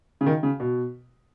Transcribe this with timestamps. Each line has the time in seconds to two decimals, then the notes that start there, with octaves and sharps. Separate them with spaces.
0.21 C#3
0.26 D#3
0.43 C#3
0.60 B2